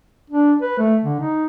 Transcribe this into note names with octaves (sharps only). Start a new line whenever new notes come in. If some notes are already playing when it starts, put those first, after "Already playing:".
D4
B4
A3
D3
D#4